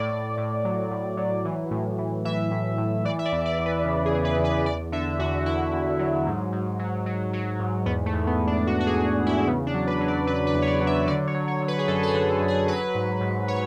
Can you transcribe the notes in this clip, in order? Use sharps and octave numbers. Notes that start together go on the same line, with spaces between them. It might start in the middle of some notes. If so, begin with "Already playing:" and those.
Already playing: A2 D5
A2
A2
F#3
A2
F#3
E3
A2
E3
E3 E5
A2
A2
E3 D5
E5
D5
E2
D5
E2
B4
C#3
G#4
E3
B4
E2
B4
E2 D5
D3 E5
E2 F#4
E2 E4
E2
F#3
G#2
G#2
F#3
F#3
F#3
G#2
E2 B3
A3
E2
B3
E2
D4
E2 F#4
F#4
G#4
E2
E2
E4
C#3 B3
D4
F#3
B4
F#3
D5
F#3 B4
B4
E2
C#5
D5
F#3
E5
D3 D5
C#5
F#3
C#5
D3
B4
G#4
F#2 A4
A4
G#4
D3
F#2
G#4
F#3 B4
G#2
G#2
C#5